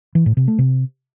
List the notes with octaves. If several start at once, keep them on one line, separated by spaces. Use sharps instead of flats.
E3
A2
C3
A3
C3